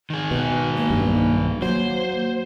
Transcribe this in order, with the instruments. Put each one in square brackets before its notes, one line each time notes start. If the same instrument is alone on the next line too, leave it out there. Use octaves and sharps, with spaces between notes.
[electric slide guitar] D#3 G#4
[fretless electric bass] B2 [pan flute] B4
[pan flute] A#3
[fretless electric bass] B1 G2
[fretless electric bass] F#3 [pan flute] A#3 [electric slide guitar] C5